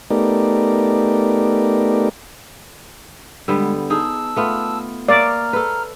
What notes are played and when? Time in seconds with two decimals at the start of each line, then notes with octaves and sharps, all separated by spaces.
0.10 A3 B3 D#4 G4 A#4 D5
3.48 D3 G3 G#3 B3
3.90 D#4 G#4 A5 E6
4.36 A3 B3 F4
5.08 A#3 C#5 D5 E5 A#5 F6
5.53 A4 B4